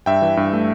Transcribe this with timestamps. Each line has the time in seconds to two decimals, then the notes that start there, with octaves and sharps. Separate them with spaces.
0.06 G2 E5 G5
0.22 E3
0.37 G2
0.53 A3